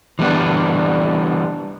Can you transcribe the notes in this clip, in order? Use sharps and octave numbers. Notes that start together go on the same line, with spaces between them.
E3 G3 B3 D4